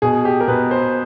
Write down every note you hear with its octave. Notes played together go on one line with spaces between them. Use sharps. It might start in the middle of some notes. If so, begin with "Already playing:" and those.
B2 G#4
G4
A#4
B2 B4
C5